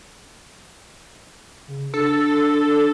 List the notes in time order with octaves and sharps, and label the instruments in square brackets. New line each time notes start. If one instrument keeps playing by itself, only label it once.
[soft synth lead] C#3
[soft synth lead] D4 [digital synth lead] A4